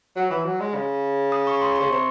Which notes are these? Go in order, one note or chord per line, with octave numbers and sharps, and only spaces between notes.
F#3
E3
F#3
G#3
C#3
D#6
C#6
C6
C#6
C#3 C6
C3 C#6